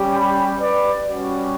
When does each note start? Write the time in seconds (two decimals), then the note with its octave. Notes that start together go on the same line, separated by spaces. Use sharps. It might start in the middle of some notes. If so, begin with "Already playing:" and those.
Already playing: G3 C#4 G4
0.15 G5 B5
0.60 B4 D5
1.06 G3 C#4 F#4